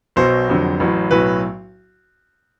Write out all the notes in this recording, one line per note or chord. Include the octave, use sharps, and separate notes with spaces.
B1 B2 F#3 C5
F1 F2 D3 F#3
A1 A2 F#3
B1 A2 F#3 B4